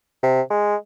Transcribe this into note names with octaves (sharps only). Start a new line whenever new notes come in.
C3
G#3